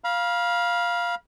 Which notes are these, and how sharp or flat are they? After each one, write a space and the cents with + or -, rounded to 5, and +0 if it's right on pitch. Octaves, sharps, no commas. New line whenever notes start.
F5 +0 B5 -40